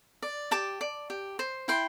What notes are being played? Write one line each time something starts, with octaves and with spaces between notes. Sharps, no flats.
D5
G4 A5 D6
D5
G4
C5
E4 G5 C6